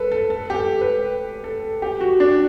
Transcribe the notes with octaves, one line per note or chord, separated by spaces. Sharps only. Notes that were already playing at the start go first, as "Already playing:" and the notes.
Already playing: A4 B4
A4
A4
G4
A4
B4
A4
G4
F#4
D4